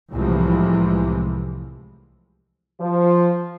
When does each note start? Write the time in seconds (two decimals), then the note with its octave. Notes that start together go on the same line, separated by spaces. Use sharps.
0.12 C2 A2 C3 E3 F3 G#3
2.80 F3